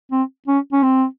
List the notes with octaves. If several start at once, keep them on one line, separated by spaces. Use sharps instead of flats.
C4
C#4
C#4
C4